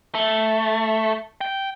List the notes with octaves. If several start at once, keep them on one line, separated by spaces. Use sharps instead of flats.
A3
G5